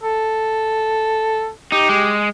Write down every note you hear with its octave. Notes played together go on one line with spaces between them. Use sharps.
A4
D#4 G4
G#3